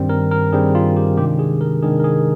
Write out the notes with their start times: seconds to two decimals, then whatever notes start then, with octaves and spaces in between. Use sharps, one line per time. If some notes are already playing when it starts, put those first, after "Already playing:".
Already playing: G2 D#3 G3 C4
0.09 A#4
0.31 A#4
0.52 G2 D#3 G3 C4 G#4
0.75 F4
0.97 G4
1.17 C3 D#3 G#3 D4 G4
1.39 G#4
1.61 A#4
1.83 C3 D#3 G#3 D4 G#4
2.00 A#4
2.04 G#4